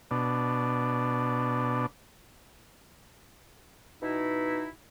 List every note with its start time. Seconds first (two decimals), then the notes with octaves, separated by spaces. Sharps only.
0.11 B2 D4
4.02 B2 D#4 E4